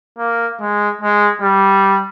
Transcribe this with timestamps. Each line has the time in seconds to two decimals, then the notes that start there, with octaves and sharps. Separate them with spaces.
0.18 A#3
0.60 G#3
1.01 G#3
1.41 G3